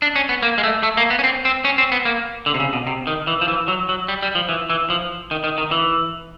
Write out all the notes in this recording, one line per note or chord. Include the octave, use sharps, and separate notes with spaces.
D4
C#4
B3
A#3
G#3
A3
A3
A#3
B3
C#4
C4
C4
C#4
C4
B3
A#3
D3
C3
C#3
B2
C3
D#3
E3
F3
E3
F#3
F#3
G3
G3
F3
E3
E3
F3
D#3
D#3
D#3
E3